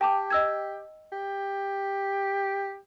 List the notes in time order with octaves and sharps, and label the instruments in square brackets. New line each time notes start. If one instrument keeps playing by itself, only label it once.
[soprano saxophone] G4 [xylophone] G5 A5 D6
[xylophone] D#5 E6 G#6
[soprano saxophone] G4